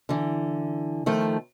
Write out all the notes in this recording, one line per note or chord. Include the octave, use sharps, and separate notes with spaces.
D3 E3
D#3 F3 A3